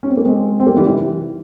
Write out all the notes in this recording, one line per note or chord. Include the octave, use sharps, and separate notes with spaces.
C#4
C4
A#3
G#3 C4
C4
G3 A#3
E3 G3
C3 E3